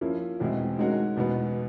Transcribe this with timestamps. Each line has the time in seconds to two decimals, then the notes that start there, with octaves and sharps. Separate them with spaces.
0.01 F3 A#3 C#4 E4
0.40 E2 B2 G#3 C4 E4
0.78 D#3 G#3 C#4 F#4 A#4
1.16 E2 B2 G#3 B3